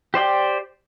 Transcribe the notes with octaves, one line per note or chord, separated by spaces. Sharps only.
G4 C5 D5 G5